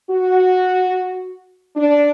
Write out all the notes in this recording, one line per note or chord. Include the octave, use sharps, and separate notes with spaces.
F#4
D4